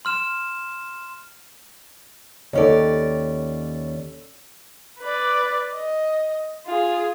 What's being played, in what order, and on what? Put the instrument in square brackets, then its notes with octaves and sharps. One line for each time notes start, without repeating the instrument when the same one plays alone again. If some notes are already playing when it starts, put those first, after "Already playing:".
[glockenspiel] C6 F6 E7
[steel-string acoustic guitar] D#2 C#4 D5 [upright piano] A4 C#5
[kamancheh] B4 D5
D#5
F4 G#4